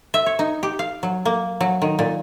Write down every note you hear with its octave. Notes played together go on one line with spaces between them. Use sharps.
E5
C#5
D#4
G4
F5
F#3
A#3
F#3
D#3
A#2